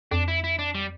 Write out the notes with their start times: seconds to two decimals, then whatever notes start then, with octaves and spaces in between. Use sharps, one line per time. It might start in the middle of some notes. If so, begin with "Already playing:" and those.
0.11 F2 D4
0.28 E4
0.44 E4
0.59 D4
0.75 G3